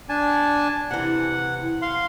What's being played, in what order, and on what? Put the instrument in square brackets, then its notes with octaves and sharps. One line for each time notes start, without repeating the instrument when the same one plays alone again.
[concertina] D4 G#5 A5
[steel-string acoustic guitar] C3 E3 [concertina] F#5
[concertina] F5 C6